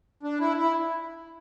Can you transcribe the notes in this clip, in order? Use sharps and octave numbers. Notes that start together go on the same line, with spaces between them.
D4
E4
E4